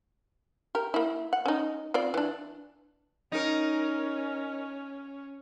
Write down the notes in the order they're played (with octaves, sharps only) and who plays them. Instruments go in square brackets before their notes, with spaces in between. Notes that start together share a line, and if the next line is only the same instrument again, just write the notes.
[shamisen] G4 A#4
A#3 E4
F#5
C#4 D#4
C4 F4 D5
E3 D4
[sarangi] C#4 [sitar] D#4 A#4